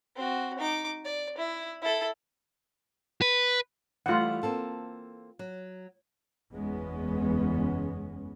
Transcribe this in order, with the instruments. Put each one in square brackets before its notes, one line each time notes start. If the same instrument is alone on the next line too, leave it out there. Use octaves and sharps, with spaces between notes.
[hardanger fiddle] C4 F#4
D#4 D6
D5
E4
E4 A4
[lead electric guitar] B4
[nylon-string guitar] E3 G3 A3 [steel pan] F4 F#5
[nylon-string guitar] A#3 C4 A4
F#3
[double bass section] F#1 E2 G#3 B3 C#4